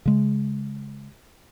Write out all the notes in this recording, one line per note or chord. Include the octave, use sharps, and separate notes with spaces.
C#3 G#3